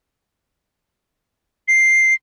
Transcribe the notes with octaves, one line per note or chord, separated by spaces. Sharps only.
C7